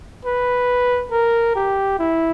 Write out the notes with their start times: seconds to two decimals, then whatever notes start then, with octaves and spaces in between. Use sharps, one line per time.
0.25 B4
1.11 A#4
1.56 G4
1.99 E4